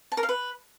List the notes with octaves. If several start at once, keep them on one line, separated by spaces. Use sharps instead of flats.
A5
A#4
F5
B4